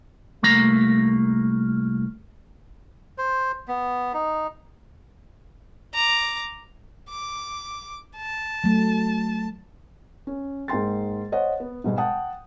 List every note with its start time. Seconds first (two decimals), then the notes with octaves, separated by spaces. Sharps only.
0.43 C2 A3 A#3 A#5
3.18 C5
3.68 B3
4.14 D#4
5.94 A#5 D6
7.09 D6
8.17 A5
8.64 F#3 A3
10.27 C#4
10.68 G#2 A#3 G5 C6 A6
11.32 C5 C#5 D#5 F#5
11.60 B3
11.84 G#2 B2 G3 G#3
11.98 F#5 G5 A5 D#6